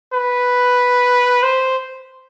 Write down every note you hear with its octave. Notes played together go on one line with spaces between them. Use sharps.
B4
C5